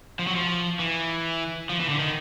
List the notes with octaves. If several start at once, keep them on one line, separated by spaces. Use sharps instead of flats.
F3
F#3
F3
E3
F3
E3
D3
D#3